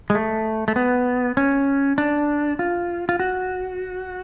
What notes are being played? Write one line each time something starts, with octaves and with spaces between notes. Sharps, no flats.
G#3
A3
A3
B3
C#4
D4
F4
F4
F#4